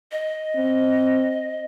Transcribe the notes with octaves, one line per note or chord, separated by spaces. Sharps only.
D#5
C4